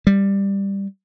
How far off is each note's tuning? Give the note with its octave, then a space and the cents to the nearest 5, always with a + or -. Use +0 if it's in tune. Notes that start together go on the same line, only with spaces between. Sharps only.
G3 +10